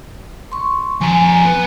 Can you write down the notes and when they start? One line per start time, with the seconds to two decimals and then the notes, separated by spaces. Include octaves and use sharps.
0.52 C6 C#6
1.01 F2 G#5 A#5
1.44 B3 B4